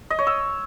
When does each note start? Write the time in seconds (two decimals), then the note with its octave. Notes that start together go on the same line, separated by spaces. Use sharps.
0.10 D#5
0.19 C#5
0.27 E6